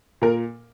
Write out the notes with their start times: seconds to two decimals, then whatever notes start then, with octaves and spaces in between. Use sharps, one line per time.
0.22 A#2 A#4